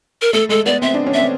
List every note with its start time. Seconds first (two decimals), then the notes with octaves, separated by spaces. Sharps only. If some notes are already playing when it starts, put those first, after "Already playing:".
0.22 A#4
0.33 A3 A4
0.49 G#3 A4
0.66 B3 D5
0.82 C4 E5
0.94 D4
1.07 C#4
1.14 C4 E5